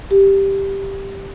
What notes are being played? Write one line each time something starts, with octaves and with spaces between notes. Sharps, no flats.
G4